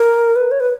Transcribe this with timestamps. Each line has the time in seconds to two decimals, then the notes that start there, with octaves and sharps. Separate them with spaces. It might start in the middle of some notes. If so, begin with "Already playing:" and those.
Already playing: A#4
0.36 B4
0.51 C#5
0.60 B4